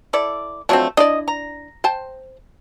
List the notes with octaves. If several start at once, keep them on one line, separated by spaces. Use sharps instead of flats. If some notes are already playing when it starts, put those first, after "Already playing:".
E4 A4 D5
F3 F#3 A3 A#3 C4 D4
D4 E4 D5 D#5
A#5
C5 G5 A5